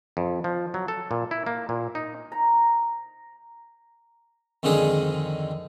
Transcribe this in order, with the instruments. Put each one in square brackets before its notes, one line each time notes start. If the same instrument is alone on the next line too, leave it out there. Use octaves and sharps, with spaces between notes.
[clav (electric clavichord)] F2
F3
F#3
A4
A#2
E4
A#3
A#2
D#4
[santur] A#5
[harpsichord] F2 G#2 D3 D#3 G#4